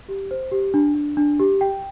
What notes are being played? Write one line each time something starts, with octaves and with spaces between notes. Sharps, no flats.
G4
C5
G4
D4
D4
D4
G4
G5